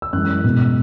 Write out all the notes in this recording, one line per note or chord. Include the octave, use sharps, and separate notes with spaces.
E6
F#2 E3 G#3 F#6
B2 G#3